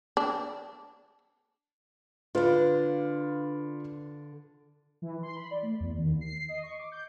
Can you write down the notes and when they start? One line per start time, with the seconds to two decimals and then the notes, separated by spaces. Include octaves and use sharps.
0.17 D4
2.35 D3 D4 F4 B4 F5
5.02 E3
5.23 C6
5.36 B5
5.51 D5
5.63 A3
5.80 E2
5.98 D#2
6.21 C7
6.49 D#5
6.63 C#6
6.79 D6
6.92 G6